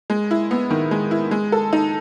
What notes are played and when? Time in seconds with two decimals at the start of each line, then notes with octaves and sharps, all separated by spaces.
0.10 G#3
0.31 E4
0.51 B3
0.71 D#3
0.91 G#3
1.11 E4
1.31 G#3
1.52 A4
1.73 D#4